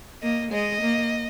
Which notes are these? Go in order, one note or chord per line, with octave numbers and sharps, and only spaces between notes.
A#3 D#5
G#3 D#5
A#3